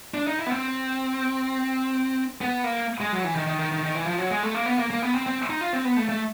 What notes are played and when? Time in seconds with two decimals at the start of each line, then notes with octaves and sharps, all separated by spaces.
0.14 D4
0.27 D#4
0.39 E4
0.46 B3
0.51 C4
2.41 B3
2.64 A#3
3.00 G#3
3.13 F#3
3.24 E3
3.36 D#3
3.47 D#3
3.59 D#3
3.72 D#3
3.83 D#3
3.95 E3
4.07 F3
4.18 F#3
4.31 G#3
4.43 A3
4.54 A#3
4.66 B3
4.79 A#3
4.90 A#3
5.02 B3
5.14 C4
5.26 C4
5.50 D#4
5.61 F4
5.73 C4
5.85 B3
5.97 A3
6.09 A3